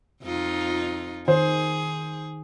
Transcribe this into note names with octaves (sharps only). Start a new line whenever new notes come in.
F2 D#4 F4
D#3 G#4 C5